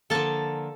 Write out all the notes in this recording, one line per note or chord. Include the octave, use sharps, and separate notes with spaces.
D3 F3 A#3 A4 A5